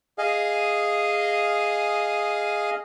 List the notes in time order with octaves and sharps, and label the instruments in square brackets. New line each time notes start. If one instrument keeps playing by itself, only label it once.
[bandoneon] G#4 D#5 F5